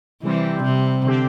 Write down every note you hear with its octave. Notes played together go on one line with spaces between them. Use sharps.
C3 E3 G3 C4
C3
D3 C4 G4